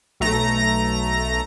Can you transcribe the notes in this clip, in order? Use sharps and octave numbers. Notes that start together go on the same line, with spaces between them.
B1 A3 A#5 A#6